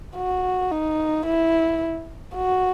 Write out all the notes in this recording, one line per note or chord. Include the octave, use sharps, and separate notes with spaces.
F#4
D#4
E4
F#4